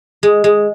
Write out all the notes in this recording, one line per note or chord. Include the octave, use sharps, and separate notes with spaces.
G#3
G#3